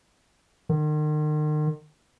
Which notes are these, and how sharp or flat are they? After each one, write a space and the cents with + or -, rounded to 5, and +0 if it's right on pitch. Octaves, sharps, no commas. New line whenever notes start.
D#3 -40